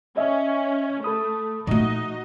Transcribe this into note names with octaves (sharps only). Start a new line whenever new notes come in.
C#4 D#5 E5
A3 A4 B5 D#6
A#2 F3 A3 D#4 F#4 D#5